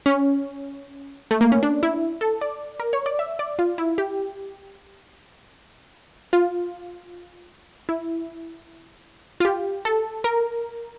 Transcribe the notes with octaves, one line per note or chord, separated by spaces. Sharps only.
C#4
A3
A#3
C#4
D4
E4
A4
D5
A#4
C#5
D5
E5
D5
F4
E4
G4
F4
E4
F4
G4
A4
A#4